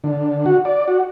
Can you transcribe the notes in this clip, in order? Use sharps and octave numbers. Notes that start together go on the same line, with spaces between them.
D3
F#4
D5
F#4